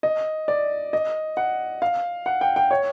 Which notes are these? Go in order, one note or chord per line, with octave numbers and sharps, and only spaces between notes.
D#5
D5
D#5
F#5
F5
F#5
G5
G5
C#5